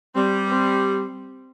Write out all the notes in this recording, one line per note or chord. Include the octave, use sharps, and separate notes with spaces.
G3 C4
C4